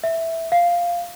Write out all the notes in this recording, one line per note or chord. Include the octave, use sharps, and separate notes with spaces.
E5
F5